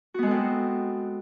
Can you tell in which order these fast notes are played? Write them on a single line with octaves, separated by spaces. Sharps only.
F#4 B3 G#3 A4 C4